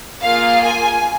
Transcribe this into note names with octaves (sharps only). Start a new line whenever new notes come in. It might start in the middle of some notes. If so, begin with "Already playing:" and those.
A#3 F4 G#4 F5
G#5